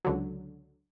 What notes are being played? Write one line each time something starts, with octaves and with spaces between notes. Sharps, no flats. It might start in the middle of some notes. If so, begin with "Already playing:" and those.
C#2 D3 F#3